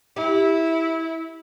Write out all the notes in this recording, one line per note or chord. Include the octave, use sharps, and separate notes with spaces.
E4 G4